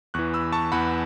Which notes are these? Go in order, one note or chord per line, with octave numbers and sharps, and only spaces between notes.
E2 E3 C#6 F#6
B5 E6
A5 C#6
E2 E3 F#5 B5